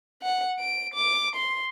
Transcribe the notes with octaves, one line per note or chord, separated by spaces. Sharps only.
F#5
D7
D6
C6